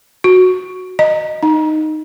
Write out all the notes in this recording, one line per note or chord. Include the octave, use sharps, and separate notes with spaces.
F#4
D#5
D#4